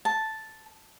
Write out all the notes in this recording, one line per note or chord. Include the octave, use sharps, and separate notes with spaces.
A5